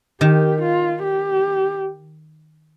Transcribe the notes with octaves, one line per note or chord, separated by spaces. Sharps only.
D#3 G4
F4
G4